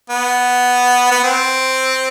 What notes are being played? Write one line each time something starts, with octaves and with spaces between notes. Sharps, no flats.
B3
B3
C4